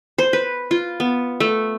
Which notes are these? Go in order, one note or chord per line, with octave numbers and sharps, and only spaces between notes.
C5
B4
F4
B3
A3